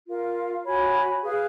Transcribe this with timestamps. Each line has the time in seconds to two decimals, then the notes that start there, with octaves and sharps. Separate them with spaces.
0.08 F4 A#4 F5
0.65 F#4 C#5 G#5 B5
1.22 G#4 B4 F5